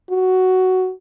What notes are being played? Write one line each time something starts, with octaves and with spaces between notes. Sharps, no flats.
F#4